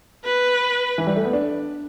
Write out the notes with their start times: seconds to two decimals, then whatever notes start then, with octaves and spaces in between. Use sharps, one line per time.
0.24 B4
0.98 E3
1.07 G3
1.16 A3
1.25 B3
1.33 D4